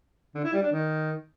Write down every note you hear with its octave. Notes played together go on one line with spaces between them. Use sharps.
D3
E4
G3
D4
D#3